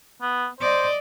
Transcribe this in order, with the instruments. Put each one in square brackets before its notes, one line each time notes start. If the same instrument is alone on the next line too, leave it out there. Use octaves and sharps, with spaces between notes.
[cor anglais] B3
[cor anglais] C5 [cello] D5 D#5